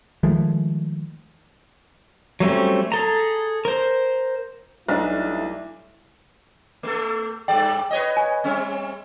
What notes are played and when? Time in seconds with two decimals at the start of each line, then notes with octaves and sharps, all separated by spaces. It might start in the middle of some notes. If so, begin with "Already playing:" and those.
0.23 D#3 F3 G#3 A3
2.40 F#3 G3 A3 C4 C#4
2.92 G#4 A4 A#5
3.65 A#4 C5
4.89 B1 G3 A3 D4 E4
6.83 A3 A4
7.48 G2 A4 D5 G5
7.91 B4 C#5 D#5
8.17 G#5
8.44 G3 C4 C#4